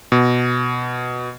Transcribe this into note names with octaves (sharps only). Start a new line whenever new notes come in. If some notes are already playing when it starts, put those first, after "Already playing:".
B2